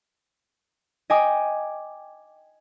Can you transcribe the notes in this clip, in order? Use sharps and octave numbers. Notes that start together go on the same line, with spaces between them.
D#5 G5 G#5 D6 D#6